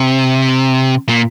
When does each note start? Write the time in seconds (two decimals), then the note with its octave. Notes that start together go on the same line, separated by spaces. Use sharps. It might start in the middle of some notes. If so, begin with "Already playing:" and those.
Already playing: C3
1.09 A#2